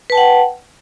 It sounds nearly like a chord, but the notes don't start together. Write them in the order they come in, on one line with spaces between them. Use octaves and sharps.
B4 A5 G5 F#5